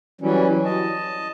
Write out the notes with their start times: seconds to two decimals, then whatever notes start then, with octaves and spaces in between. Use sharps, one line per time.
0.21 E3 F#3 G3 C#4
0.65 D#5 A5